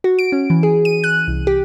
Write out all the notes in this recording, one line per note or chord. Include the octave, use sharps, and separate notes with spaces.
F#4
D7
C#4
E3
G#4
D#7
F#6
C2
G4